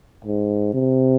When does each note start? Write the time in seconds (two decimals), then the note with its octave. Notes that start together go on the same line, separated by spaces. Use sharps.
0.24 G#2
0.74 C3